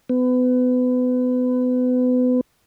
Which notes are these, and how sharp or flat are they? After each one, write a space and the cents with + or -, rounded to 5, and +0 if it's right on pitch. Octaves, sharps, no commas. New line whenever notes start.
B3 +30